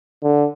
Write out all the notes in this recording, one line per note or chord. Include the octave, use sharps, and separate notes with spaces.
D3